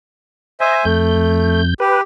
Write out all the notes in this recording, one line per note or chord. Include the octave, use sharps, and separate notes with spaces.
C5 D#5 E5 G#5
F2 A3 G6
G4 B4